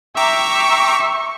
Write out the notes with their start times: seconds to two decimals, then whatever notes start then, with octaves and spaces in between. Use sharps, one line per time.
0.17 E5 G5 A#5 C#6 D6